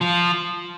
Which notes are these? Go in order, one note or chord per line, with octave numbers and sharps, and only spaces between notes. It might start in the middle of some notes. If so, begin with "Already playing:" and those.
F3